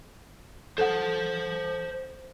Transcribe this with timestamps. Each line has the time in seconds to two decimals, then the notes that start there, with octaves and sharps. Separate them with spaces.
0.78 A4 C5 F#5 A5